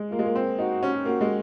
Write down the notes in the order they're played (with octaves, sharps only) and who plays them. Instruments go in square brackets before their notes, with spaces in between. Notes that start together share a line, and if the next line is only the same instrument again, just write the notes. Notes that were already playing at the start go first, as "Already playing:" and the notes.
Already playing: [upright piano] G#3
[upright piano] A#3 [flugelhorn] F4
[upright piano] G#3
A#3
C4
[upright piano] D#4 [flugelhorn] F#4
[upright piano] C#4
[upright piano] A#3 [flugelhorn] F#4
[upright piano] G#3